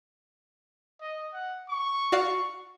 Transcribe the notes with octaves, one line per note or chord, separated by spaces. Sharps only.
D#5
F#5
C#6
F#4 D5 F5